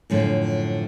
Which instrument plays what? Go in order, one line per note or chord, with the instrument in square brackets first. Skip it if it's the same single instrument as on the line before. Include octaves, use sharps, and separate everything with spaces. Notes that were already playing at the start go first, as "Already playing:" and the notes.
[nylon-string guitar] F#2 A2 D3 F3